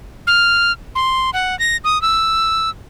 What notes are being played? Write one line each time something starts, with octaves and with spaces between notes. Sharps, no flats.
F6
C6
F#5
A#6
D#6
E6